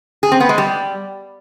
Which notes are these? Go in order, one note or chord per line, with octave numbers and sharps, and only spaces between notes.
G#4
C4
B3
G#3
G3